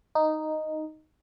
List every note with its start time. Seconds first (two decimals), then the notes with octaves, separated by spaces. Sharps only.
0.15 D#4